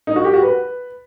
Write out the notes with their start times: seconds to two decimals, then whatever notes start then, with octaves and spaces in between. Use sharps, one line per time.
0.07 D#4
0.16 F#4
0.25 G4
0.33 F#4
0.42 B4